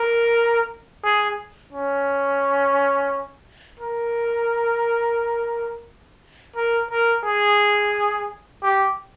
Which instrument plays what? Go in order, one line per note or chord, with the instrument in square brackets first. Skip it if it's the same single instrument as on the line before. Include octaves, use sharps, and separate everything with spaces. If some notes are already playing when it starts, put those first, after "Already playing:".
Already playing: [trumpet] A#4
G#4
C#4
A#4
A#4
A#4
G#4
G4